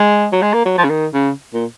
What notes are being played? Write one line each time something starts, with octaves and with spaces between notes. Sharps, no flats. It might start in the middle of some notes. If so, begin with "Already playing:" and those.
Already playing: G#3
F#3
G#3
A#3
F#3
F3
C#3
D#3
C#3
A#2